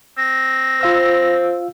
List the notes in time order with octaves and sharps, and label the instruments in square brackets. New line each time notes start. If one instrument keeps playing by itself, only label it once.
[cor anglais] C4 [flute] A#6
[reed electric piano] F4 F5 E6 [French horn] C5